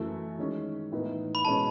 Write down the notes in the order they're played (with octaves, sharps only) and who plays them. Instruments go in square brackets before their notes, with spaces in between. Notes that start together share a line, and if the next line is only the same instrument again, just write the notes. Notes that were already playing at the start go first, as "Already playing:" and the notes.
Already playing: [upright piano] F#2 E3 A3
D#3 G#3 C#4 E4
A2 E3 B3 D#4
[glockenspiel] B5
[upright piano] B2 G#3 C#4 [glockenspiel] A5